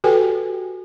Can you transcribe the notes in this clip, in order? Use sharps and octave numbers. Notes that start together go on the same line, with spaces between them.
F#4 G4 A4 B4 G5 G#5